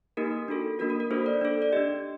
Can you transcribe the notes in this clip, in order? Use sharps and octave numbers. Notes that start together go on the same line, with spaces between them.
A#3 D#4 G4 A#4
D4 F#4 A4
A#3 D4 F#4 A#4
A#4
A#4
A#3 D4 F#4 A4 C5
D5
D4 A4
D5
D4 G4 D#5